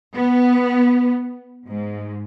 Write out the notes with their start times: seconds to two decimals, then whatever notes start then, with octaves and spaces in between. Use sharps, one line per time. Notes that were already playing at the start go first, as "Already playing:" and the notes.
0.15 B3
1.67 G#2